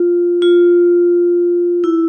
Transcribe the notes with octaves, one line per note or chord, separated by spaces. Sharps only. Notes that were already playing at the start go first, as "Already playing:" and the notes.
Already playing: F4
F4
E4